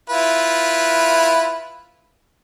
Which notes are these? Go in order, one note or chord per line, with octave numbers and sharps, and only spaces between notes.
E4 F4 B4